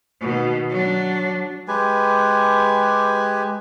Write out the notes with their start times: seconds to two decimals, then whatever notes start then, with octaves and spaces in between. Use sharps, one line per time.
0.21 B2 D#3
0.70 F#3 D4
1.68 G#3 G4 B4 G#5